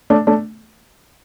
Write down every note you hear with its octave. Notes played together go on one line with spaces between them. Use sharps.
A3 D4
A3 D4